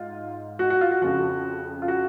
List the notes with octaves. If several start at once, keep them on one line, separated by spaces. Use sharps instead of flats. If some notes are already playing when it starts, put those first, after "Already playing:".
Already playing: G#2 F4
F#4
F#4
F4
F#4
F2 C#3 F3 F#4
F4
F#4